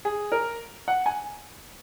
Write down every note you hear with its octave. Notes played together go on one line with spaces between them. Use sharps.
G#4
A#4
F#5
G#5